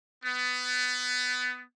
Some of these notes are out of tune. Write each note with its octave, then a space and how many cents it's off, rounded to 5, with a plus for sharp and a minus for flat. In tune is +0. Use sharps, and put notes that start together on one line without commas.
B3 +20